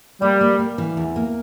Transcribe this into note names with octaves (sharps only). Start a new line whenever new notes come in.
G3 A#3
A#3
A#3
E3
E2
A#3